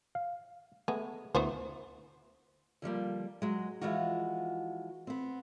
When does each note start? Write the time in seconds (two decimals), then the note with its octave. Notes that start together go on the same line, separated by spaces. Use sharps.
0.15 F5
0.88 G#3 A3 B3
1.35 D2 B3 E4 F#4 C5
2.82 D3 F3 G3 A#3
3.42 F#3 G#3
3.81 E3 F3 G#3 F4 F#4
5.07 B3 C4